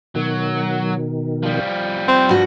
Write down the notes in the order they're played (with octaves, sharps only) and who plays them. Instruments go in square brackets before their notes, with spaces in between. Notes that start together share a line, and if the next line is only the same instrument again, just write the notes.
[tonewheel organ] B2 D#3 [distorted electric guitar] F#3
[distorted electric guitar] F3 G3
[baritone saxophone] C4
[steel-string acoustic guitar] G2 F#4